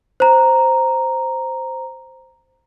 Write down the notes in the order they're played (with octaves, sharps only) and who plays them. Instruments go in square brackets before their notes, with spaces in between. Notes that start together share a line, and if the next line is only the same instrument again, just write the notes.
[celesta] C5 A#5